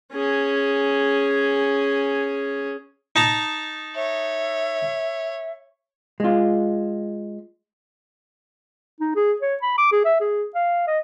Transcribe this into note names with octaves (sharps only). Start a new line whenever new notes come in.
C#4 G#4
D#4 A5 A#5
C#5 E5
G#3 F4
D#4
G#4
C#5
B5
D6
G#4
E5
G#4
F5
D#5